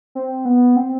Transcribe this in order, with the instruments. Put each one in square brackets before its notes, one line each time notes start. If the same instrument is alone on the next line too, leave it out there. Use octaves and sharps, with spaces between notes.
[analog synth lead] C4
B3
C4